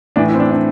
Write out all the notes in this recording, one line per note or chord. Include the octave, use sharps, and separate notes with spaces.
A2 E3 D4
E4
C4
D4
D4